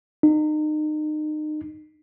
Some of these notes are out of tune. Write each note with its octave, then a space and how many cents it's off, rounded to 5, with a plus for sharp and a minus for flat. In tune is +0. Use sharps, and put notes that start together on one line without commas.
D#4 -30